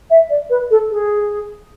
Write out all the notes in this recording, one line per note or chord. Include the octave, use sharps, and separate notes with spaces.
E5
D5
B4
A4
G#4